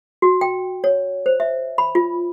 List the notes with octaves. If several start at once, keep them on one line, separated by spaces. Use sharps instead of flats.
F#4
G5
C#5
C5
E5
B5
F4